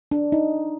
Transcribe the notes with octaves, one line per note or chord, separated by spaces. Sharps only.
D4
D#4